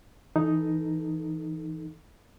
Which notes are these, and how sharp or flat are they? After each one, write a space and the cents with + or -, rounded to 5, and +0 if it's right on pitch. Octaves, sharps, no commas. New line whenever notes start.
E3 +0 D#4 +0 A4 +0